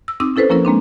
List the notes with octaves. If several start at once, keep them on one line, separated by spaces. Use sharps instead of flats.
E6
C4 D#4 D6 E6
C#4 E4 A4 B4 C5
F3 A#3 C#4 E4 A#4
G#3 A#3 C4 D4